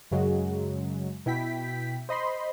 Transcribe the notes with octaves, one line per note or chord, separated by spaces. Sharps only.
F#2 C#3 F#3 G#3
B2 E4 G5 B6
C5 D#5 B5 C6